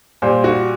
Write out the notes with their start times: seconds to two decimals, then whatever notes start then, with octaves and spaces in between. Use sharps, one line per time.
0.22 A#2 G3 C5
0.44 F#4